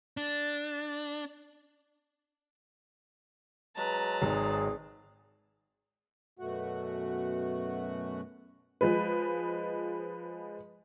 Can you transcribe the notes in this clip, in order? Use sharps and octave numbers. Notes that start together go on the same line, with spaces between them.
D4
F#3 G#3 B4 A5 A#5
G#1 G#4
F#2 B2 A3 F#4 F#5
F3 G#3 B4